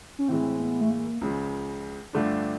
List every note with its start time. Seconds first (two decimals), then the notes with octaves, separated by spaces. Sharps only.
0.19 C#4
0.28 A2 E3 G#3 C4
0.59 B3
0.81 A3
0.90 A#3
1.21 C#2 C#3 F3
2.13 G2 D3 F3 A3 D4